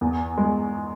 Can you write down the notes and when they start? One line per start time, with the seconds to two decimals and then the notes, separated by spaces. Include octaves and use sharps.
0.01 E2
0.37 G#3